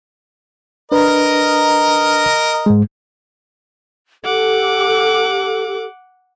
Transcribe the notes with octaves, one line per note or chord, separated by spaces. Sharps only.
D4 A#4 B4 D#5
G#2 G#3
G4 A4 F#5 D6